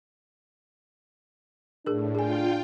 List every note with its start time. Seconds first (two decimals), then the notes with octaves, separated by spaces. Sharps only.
1.86 A2 D4 G#4 A#4
2.15 F4 G#4 G5 G#5